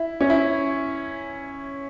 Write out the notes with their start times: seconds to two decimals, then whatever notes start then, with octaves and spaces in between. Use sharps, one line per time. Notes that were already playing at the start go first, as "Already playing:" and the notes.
Already playing: E4
0.21 C#4
0.30 E4